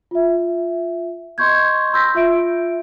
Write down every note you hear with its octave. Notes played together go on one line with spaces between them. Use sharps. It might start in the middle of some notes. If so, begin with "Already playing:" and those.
F4 E5
D#5 C6 C#6 G6 G#6
B5 C6 E6 G6 A#6 B6
F4 E5 D7